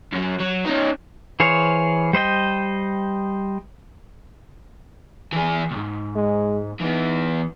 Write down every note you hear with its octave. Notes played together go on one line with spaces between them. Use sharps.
F#2 F#3
F#3
C#4 D#4
E3 G#4 C5 C#5 F5
G3 C5 D#5 G5
E3 G#4
C2 G#2
G#3
E3 B3 D#4